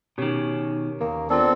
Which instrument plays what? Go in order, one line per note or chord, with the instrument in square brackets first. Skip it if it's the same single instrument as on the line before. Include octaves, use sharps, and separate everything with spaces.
[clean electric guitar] B2 D#3 [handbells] C#4 G4 C#5
[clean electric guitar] D#2 [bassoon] A#3
[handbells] B3 F4 [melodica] C4 A4 [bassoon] D4